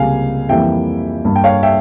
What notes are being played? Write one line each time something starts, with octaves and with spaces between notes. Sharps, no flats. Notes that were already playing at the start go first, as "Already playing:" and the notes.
Already playing: C#2 C3 G3 A#3 F5 G#5
F2 E3 G3 A#3 E5 G5
G2 G3 A#3
G5
C#5 F5
E5 G5